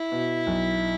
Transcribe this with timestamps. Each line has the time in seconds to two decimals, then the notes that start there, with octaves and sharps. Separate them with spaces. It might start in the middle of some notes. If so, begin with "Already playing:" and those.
Already playing: E4
0.12 B2
0.47 B1